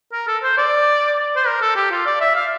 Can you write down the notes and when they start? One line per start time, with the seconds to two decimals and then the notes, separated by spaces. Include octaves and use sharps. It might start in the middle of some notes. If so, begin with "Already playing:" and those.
0.13 A#4
0.28 A4
0.43 C5
0.58 D5
1.36 C5
1.47 A#4
1.62 A4
1.76 G4
1.91 F4
2.06 D5
2.21 E5
2.36 F5